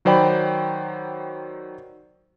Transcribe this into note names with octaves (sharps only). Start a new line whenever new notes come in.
D#3 F#3 C5 D5 G5 B5